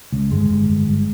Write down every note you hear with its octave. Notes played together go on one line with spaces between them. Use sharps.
C#2
G1 G#3
G1
G1
G1